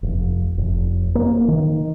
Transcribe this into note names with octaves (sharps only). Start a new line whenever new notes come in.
F1
F1
A#3
D#3